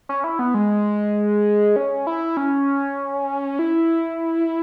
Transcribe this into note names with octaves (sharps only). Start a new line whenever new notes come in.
C#4
E4
B3
G#3
C#4
E4
C#4
E4